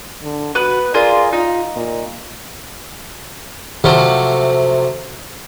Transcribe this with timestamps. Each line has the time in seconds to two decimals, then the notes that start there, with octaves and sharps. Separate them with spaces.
0.23 D3
0.55 B3 F#4 B4
0.94 F4 G#4 A#4 D5
1.33 D#4 F4
1.76 A#2
3.84 C3 F3 F#3 A3